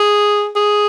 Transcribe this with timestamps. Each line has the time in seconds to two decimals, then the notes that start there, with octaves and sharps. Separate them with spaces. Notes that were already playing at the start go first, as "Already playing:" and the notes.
Already playing: G#4
0.56 G#4